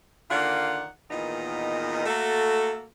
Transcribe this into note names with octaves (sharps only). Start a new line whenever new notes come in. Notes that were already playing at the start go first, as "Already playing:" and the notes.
D3 D#3 A#3 F4 D5 F#5
E2 A#2 D#3 B3 D#4 D#5
A3 A#3 F#4 A4